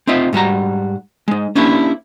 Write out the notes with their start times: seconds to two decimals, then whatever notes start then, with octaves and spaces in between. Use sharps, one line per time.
0.07 C4 D#4 F4 E5
0.33 G#2 G3 F#4 A#5
1.28 G#3 D#4
1.55 A#3 C#4 D4 E4 G4